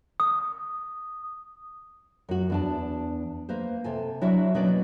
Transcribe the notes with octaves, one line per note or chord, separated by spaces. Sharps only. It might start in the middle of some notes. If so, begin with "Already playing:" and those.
D#6
F#2 F#4
E2 D4 A5
A#3 B4 C5
C3 A4 G#5
F#3 D4 E4 F#4 D5 E5
B2 F#3 A#3 C#4 B4 D5